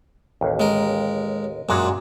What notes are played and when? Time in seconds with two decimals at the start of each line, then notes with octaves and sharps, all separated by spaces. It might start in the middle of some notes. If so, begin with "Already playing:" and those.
0.41 A1 D#2
0.60 G#3 A#4
1.69 F#2 A#2 G#3 D4 F#4